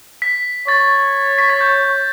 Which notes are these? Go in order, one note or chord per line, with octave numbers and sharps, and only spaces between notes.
B6
C#5 A6
B6
A6
G6